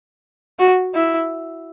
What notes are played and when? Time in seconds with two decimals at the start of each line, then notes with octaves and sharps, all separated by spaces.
0.59 F#4
0.95 E4